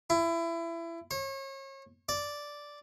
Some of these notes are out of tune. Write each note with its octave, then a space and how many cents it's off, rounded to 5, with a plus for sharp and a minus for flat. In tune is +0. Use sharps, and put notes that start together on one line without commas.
E4 +25
C#5 -35
D5 -5